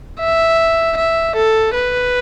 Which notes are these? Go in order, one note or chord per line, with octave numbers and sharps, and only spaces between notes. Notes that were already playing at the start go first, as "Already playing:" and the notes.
E5
E5
A4
B4